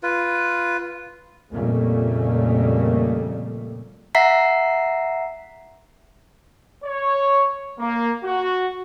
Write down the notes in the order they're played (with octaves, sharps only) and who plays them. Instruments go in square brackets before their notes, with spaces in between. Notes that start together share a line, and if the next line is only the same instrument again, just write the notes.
[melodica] F4 B4
[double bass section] F2 A#2 C#3 G3 A3 A#3
[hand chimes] E5 F#5 A#5 B6 C7
[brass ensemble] C#5
A#3
F#4